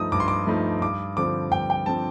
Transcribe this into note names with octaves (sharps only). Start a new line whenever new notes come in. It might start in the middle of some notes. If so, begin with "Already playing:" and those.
Already playing: G2 F3 A3 D#4 D#6
G2 D6
C6
D6
F3 A3 D#4
G2 D6
D3 F3 C4 D6
G2 G5
G5
D3 F3 C4 A5